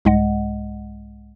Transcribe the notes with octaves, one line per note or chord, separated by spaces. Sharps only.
C2 G#2 G#3 D#5 F#5